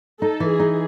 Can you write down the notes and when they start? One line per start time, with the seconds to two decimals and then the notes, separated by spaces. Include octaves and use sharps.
0.21 D#4 A4
0.40 E3
0.50 G#4
0.60 D#4